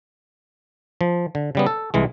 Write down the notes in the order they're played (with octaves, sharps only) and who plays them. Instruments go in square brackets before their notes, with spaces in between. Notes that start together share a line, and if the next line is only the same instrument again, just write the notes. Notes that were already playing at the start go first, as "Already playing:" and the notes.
[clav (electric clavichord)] F3
D3
C#3 G3 B3
A4
C2 E3 G#3